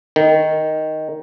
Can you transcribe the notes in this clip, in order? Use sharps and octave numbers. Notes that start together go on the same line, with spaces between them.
D#3